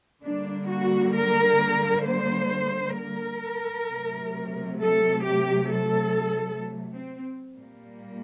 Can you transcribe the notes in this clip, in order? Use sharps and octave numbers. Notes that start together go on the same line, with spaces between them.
D3 G3 A#3 D4
F#4
A#4
C5
A#4
C3 F#3 A3
A4
G4
A4
C4
A#2 G3 A#3